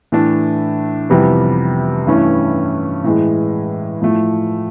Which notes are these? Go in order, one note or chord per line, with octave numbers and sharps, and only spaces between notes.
A2 E3 A3 D4
F2 C3 E3 G3 B3
G2 E3 A3 C#4 E4
A2 E3 G#3
A2 F3 A3